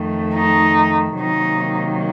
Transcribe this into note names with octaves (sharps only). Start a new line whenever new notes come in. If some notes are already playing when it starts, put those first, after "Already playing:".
Already playing: F2 D#3 A3
D#4
C3 D#3 F#3 A#3 D#4